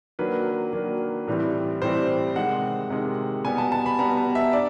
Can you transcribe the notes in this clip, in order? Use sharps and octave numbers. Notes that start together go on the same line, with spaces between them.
D#3 F#3 A#3 D4 B4
D#3 F#3 A#3 D4
A2 E3 G3 C4
A2 E3 G3 C4 C5
C3 D#3 G#3 F#5
C3 D#3 G#3
B2 G3 B3 G#5
A5
A5
B5
B2 G3 B3 A#5
A5
E5
D4 D5